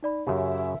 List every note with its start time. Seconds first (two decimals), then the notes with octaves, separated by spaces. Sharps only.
0.03 D#4 D5 B5
0.27 F#2 C#3 G4 E5